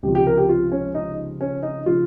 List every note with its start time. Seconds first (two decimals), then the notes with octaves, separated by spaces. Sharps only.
0.03 C#2 C3 F3 G4
0.15 G4
0.27 A#4
0.38 G4
0.49 F4
0.72 C#4
0.95 D#4
1.41 C#4
1.63 D#4
1.86 C#3 F3 F4